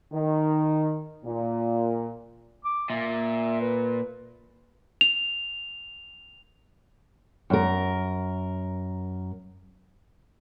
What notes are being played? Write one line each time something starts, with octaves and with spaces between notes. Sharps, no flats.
D#3
A#2
D6
A#2 E5
B4
F7
F#2 A#4